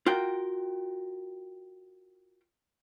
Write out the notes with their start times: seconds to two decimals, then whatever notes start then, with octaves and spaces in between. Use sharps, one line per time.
0.06 F4 F#4 A#4 G5